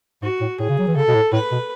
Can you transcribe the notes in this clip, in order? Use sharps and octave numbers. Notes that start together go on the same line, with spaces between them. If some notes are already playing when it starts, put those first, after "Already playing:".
G#2 F#4
A2
A2 G#4
C#3
F#3
E3
C#3 A4
B2
A2
A2 B4
B2